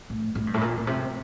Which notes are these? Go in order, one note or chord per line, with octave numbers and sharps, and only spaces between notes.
A2
A2
G2
A2
A#2
A#2
C3